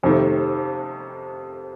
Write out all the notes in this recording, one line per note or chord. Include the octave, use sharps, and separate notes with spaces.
F1 F2 C3 D#3 A3